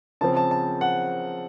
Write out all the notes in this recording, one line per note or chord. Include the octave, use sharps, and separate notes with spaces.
C#3 F3 C4 A5
A5
A5
F#5